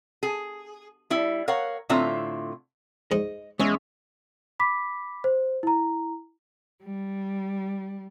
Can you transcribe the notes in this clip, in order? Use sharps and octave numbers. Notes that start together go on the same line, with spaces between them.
G#4
G3 E4
A#4 C#5 F5 F#5
A2 D3 C4 F4 E5 A#5
G#2 D#5
E2 G#3 C#4 E5
B5 D6 B6
C5
E4 A#5
G3